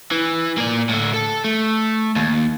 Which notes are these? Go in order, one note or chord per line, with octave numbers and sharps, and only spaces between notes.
E3
A#3 D5
A2 D3
A4
A3
D#2